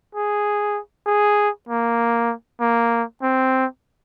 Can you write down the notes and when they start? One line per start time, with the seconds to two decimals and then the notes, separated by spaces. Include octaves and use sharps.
0.15 G#4
1.06 G#4
1.69 A#3
2.60 A#3
3.22 C4